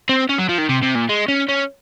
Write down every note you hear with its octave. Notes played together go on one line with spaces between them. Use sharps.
C4
C#4
F#3
F3
D#3
C3
C3
A#2
G#3
C#4
C#4